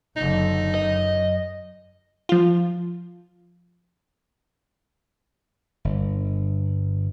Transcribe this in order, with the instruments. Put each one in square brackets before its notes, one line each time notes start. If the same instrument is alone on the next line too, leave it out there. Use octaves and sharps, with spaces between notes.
[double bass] F#1 D3 [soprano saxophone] D#4
[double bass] F#2 [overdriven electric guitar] D#5
[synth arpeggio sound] F3 F4
[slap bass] G1